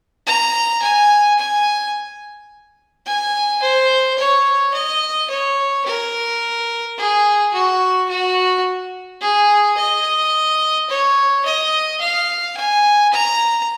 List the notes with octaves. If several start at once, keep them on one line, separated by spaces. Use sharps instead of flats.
A#5
G#5
G#5
G#5
C5
C#5
D#5
C#5
A#4
G#4
F#4
F#4
G#4
D#5
C#5
D#5
F5
G#5
A#5